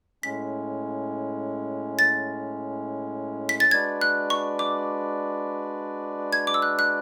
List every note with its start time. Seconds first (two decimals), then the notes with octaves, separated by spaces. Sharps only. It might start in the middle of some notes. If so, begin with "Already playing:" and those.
0.23 A2 G#3 C#4 B6
1.99 A6
3.49 B6
3.60 A6
3.71 G#3 D4 F#4 B4 D5 G#6
4.01 F#6
4.30 C#6
4.59 D6
6.33 G#6
6.47 D6
6.54 E6
6.62 F#6
6.79 F#6